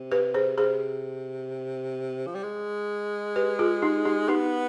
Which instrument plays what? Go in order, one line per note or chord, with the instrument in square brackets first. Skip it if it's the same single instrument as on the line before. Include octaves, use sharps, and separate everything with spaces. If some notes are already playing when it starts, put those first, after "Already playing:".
Already playing: [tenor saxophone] C3
[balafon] G4 B4
G#4 C5
[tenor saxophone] C3 [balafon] G#4 C5
[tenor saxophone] F3
G3
G#3
[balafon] G4 B4
F4 G#4
D#4 G4
D#4 G4
[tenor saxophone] B3 [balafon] D#4 G4